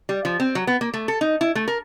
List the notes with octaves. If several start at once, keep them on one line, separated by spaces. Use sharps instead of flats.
G3
F3
C4
F#3
B3
A#3
A3
A4
D#4
E4
A3
A#4